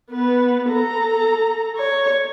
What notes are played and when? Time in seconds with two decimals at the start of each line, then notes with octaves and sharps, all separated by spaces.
0.10 B3 B4
0.70 A4 A#5
1.77 C#5